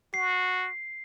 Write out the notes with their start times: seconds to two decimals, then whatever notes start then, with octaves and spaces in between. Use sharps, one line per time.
0.14 F#4 C7